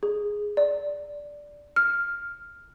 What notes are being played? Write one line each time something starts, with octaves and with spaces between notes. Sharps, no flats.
G#4
D5
F6